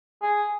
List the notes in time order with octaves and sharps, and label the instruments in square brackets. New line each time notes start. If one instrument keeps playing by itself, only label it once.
[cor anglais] G#4